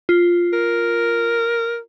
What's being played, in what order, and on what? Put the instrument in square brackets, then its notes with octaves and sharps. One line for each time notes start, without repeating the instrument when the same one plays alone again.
[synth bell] F4
[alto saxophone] A#4